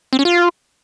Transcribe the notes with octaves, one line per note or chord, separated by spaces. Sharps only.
C4
C#4
F4